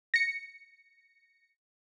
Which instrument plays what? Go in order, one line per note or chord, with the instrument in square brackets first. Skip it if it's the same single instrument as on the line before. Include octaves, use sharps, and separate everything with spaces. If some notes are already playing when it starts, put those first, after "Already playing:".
[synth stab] A#6 C#7